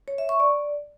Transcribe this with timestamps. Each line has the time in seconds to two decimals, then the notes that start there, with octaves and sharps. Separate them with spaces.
0.08 C#5
0.18 E5
0.29 C#6
0.40 D5